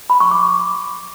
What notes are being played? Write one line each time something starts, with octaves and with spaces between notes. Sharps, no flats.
B5
C#6
D6